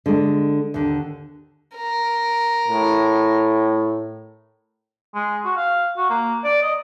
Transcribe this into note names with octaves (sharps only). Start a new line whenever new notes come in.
D3 G#3
D#2 D3
A#4
A2
G#3
F#4
F5
F#4
A#3
D5
D#5